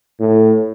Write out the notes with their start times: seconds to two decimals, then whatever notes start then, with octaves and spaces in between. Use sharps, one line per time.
0.20 A2